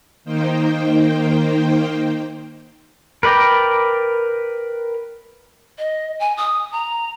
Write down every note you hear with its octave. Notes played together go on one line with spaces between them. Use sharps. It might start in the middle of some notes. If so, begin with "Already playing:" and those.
D#3 A#3 D#4 C5 G5
A#4 B4 D5 G5 A#5
D#5
G#5
D#6
A#5